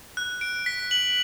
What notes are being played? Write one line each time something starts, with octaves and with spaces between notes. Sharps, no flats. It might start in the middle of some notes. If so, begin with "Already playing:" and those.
F#6
D7
B6
F#7